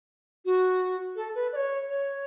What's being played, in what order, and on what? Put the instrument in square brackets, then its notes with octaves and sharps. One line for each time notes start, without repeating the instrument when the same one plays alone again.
[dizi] F#4
A4
B4
D5
C#5
C#5